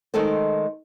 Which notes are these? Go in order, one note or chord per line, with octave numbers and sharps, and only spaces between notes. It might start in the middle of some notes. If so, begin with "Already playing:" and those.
D#3 G#3 A3 A4 A#4 C5